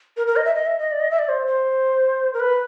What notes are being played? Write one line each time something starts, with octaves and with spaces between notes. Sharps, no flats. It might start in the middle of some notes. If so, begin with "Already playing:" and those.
A#4
A#4
D#5
E5
D#5
E5
D#5
D5
D#5
E5
D5
C5
C5
A#4
B4